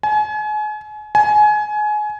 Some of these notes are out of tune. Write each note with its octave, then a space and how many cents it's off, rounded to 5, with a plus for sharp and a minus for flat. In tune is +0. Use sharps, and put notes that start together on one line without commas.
G#5 +35
G#5 +25